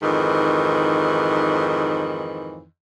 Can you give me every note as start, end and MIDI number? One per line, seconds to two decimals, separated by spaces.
0.02 2.65 41
0.02 2.65 44
0.02 2.65 51
0.02 2.65 52